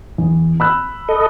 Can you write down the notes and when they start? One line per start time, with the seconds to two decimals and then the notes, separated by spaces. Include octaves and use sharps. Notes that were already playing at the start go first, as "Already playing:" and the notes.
0.18 E2
0.60 B5 E6 F#6
1.09 A4 D#5